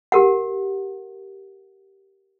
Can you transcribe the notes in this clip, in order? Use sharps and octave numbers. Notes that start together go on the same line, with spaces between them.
G4 A#4 F#5